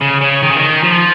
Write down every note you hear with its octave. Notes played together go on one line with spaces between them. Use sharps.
C#3
C#3
D#3
C#3
D#3
F3